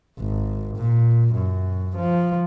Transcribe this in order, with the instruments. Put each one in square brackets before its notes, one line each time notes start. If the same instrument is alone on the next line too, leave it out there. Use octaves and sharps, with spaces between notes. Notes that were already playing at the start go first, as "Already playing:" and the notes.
[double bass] G#1
A#2
F#2
F3